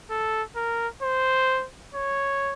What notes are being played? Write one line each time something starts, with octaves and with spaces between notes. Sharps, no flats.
A4
A#4
C5
C#5